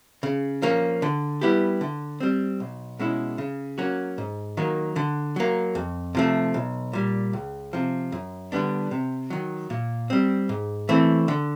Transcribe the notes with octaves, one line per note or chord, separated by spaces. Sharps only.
C#3
F3 A#3 C#4
D3
G3 B3 E4 G4
D3
G3 C4
B1
B2 G#3 C#4 E4
C#3
F#3 A#3 C#4 F#4
G#2
D#3 F#3 A#3
D3
F#3 A#3
F2
C3 F3 A3
B1
A#2 G3
C#2
C3 F3
F#2
D3 G3 B3 D4
C3
D#3 F#3
A#2
G3 C4
G#2
E3 A3 C4
D3